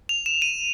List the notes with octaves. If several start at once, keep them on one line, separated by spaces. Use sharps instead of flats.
F7
E7
D#7